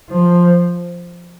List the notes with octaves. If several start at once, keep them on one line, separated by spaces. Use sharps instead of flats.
F3